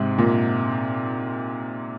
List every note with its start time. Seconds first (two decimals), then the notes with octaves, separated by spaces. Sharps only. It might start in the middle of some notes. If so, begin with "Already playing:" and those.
Already playing: G#2 C3
0.18 A#2